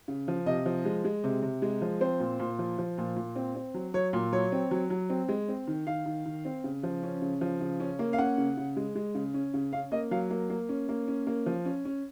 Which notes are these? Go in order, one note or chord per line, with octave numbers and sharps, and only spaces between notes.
C#3
F3
C3 D#5
F3
G#3
G#3
C3
C3
G#3
F3
C4 C5
A#2
A#2
F3
F3
A#2
A#2
C4
C4
F#3
F#3 C#5
A#2
F#3 C#5
C4
F#3
F#3
C4
G#3
C4
D#3
D#3 F5
D#3
D#3
C4
C#3
F3
C#4
C#3
F3
C#3
C#4
A#3
F5
C#4 F#5
C#3
C#3
G#3
G#3
C#3
C#4
C#3
C#4 F5
A#3 D#5
F#3 F5
A#3
A#3
C#4
A#3
C#4
A#3
F3
C#4
C#4